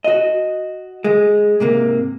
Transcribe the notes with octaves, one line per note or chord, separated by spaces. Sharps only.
F#4 D#5
G#3
G#2 C3 A#3